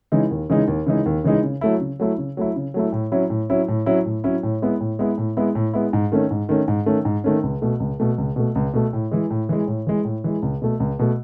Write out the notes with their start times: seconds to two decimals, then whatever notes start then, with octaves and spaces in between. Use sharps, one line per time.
0.12 C#3 E3 G#3 D#4
0.31 D#2
0.50 C#3 E3 G#3 D#4
0.68 D#2
0.86 C#3 E3 G#3 D#4
1.06 D#2
1.24 C#3 E3 G#3 D#4
1.44 C#3
1.61 F#3 A3 E4
1.81 C#3
2.00 F#3 A3 E4
2.18 C#3
2.37 F#3 A3 E4
2.56 C#3
2.74 F#3 A3 E4
2.92 A2
3.12 F#3 C#4 E4
3.30 A2
3.49 F#3 C#4 E4
3.68 A2
3.86 F#3 C#4 E4
4.06 A2
4.24 F#3 C#4 E4
4.43 A2
4.62 G#3 B3 E4
4.80 A2
4.99 G#3 B3 E4
5.18 A2
5.37 G#3 B3 E4
5.55 A2
5.74 G#3 B3 E4
5.93 G#2
6.12 D#3 A3 C#4
6.31 G#2
6.49 D#3 A3 C#4
6.68 G#2
6.86 D#3 A3 C#4
7.05 G#2
7.24 D#3 A3 C#4
7.43 C#2
7.62 B2 A3
7.80 C#2
8.00 B2 A3
8.18 C#2
8.36 B2 A3
8.55 C#2
8.73 B2 A3
8.93 A2
9.11 E3 G#3
9.31 A2
9.49 E3 G#3
9.67 A2
9.87 E3 G#3
10.05 A2
10.24 E3 G#3
10.42 C#2
10.62 B2 A3
10.80 C#2
10.99 B2 A3